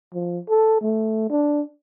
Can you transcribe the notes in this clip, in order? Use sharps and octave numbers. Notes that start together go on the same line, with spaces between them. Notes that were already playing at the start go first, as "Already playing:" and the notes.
F3
A4
A3
D4